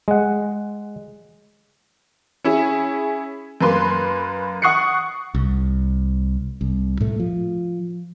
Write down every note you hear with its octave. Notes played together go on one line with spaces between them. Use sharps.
G#3 F#5
C#4 E4 G#4
F#2 A#3 B4 C6
F#5 C#6 D#6 F#6 C7 C#7
C2
C2
A2 A3
F3